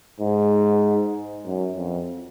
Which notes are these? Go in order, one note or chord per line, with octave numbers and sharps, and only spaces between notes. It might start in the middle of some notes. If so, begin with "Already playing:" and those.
G#2
F#2
F2